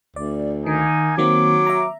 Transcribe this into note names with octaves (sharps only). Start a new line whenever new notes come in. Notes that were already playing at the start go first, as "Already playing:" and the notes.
D2 D5
D#3 A#3 D#4 G#5
D#3 F#3 A#3 C4 D6
E5 A#5